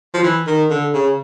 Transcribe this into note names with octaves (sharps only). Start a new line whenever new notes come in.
F3
E3
D#3
D3
C#3